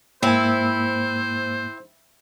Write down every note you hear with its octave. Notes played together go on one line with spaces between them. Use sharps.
G#2 A#3 C4 E4 C5 G#5